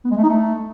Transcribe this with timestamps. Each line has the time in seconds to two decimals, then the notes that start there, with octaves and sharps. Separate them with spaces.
0.05 B3
0.11 G#3
0.17 A3
0.23 D#4
0.29 A3